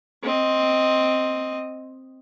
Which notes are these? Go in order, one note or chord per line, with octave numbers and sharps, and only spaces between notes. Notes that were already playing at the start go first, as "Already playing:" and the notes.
C4 D#5